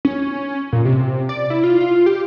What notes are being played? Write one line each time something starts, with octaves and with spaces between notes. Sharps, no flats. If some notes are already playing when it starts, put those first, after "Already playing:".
C#4
A#2
C3
D5
E4
F4
F4
G4